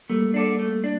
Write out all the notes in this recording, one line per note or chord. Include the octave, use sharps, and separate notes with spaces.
G3 A3 A#3
D4 A4 D5
A3
D4